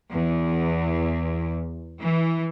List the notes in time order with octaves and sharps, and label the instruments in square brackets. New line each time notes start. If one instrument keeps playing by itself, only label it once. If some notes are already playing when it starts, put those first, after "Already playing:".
[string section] E2
E3